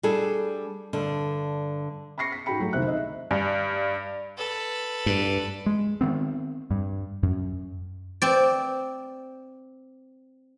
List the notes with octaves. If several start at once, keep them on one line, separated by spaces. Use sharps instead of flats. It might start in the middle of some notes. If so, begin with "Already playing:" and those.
G3 D4 G#4 A4
G2 D3
B5 C#6 A#6 C7 C#7
B6
G#2 F#4 G#4 G5 B5 C#7
F#3 A3
C2 D#3 C4 C5 E5 F#6
D#4 D#5 E5
G2
A4 B4
G2
G#3
D#3 B3 C4
G2
F#2
C4 D5